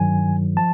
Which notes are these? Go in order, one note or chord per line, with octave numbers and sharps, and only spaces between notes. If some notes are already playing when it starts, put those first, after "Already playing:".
Already playing: G2 D#3 F#3 G#5
F3 A5